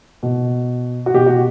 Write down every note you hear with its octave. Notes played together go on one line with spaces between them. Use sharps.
B2
F#4
B2 G4
F#4